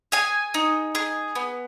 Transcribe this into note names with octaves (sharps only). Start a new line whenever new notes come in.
G#4 G#5
D#4
G#4
B3